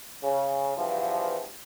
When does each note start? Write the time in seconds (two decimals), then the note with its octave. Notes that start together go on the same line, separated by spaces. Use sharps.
0.23 C#3
0.77 E2 G2 F3